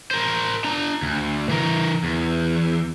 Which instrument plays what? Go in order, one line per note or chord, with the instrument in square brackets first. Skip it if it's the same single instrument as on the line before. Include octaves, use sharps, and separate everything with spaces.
[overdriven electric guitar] A#4 C5
D4 A#5
D2
E3 A#4
E2